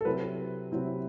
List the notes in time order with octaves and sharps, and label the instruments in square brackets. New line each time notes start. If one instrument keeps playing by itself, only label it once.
[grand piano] A4
C3 F#3 C4 E4 B4
C3 F#3 C4 E4